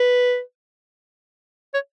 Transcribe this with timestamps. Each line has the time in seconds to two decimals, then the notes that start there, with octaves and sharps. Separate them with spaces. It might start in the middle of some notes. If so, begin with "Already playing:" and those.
Already playing: B4
1.74 C#5